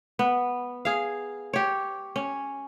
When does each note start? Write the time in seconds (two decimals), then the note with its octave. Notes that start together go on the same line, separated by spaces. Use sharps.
0.19 B3
0.85 G#4 F5
1.53 G4 C#5
2.16 C#4